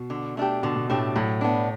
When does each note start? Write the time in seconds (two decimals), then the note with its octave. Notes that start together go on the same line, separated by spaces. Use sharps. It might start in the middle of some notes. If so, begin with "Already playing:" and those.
Already playing: B2
0.10 D3
0.37 A3 D4 G4
0.63 B2 D3
0.76 B2
0.89 A2 A3 D4 G4
1.16 A2 F#3
1.41 B3 D4